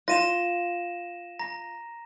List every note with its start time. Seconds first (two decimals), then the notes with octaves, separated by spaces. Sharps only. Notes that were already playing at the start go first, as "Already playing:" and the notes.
0.08 F4 A#6 D#7 E7
1.39 A#5 A#6